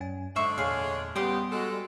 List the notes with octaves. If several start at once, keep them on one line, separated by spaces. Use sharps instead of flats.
F#2 C#4 G#5
G#2 D3 G#3 D4 C5 E5 C#6
E2 A#2 G#4 C#5 F5
C#3 G3 B3 G4 C6 D#6
G#3 F#4 A4
G3